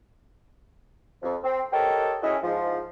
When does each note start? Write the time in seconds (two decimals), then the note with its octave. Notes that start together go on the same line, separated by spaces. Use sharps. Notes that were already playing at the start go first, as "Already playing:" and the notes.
1.22 F2
1.43 C4
1.72 G4 A4 A#4 C#5 D#5 G5
2.22 C#4 E4 F#4 G#4 D#5
2.41 G#2 F3